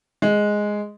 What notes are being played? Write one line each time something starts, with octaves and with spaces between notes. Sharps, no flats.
G#3